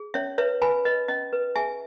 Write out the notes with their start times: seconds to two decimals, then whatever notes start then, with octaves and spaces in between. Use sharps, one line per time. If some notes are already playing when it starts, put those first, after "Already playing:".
Already playing: G#4
0.14 C#4 C#5 E5
0.38 B4 C#5 E5
0.61 B4 G#5 B5
0.85 B4 D#5
1.08 C#4 D#5
1.33 B4
1.56 G#4 E5 G#5